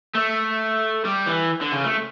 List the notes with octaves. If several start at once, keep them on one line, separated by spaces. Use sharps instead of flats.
A3
G3
E3
D3
C#3
A3